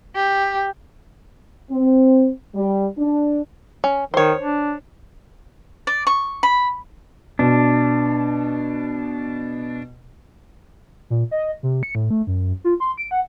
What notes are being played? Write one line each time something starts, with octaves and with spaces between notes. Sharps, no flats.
G4
C4
G3
D4
C#4
D#3 C5 C#5
D4
D5
C#6
B5
B2 D4
A#2
D#5
C3
C#7
A2
A3
F#2
F4
C6
D7
F#5